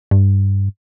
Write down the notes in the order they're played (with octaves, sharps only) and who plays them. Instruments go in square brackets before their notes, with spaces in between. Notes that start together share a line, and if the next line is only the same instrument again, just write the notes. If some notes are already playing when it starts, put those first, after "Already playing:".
[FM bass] G2